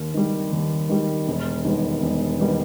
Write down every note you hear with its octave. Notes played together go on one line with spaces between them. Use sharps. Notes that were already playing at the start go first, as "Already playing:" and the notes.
Already playing: D#2
D#3 G3
D#2
D#3 G3
E1
D#2 D#3 G3 B3
E1
D#3 G3 B3